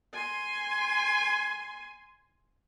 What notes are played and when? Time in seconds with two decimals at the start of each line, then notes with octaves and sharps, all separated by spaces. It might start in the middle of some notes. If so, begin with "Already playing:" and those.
0.13 G#5 C6